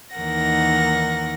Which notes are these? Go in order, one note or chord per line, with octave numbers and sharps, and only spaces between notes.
D#2 D#3 E3 A#4 F#5 A#6